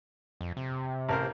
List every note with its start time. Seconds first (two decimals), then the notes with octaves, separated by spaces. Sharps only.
0.41 F2
0.57 C3
1.09 A1 A#4 C5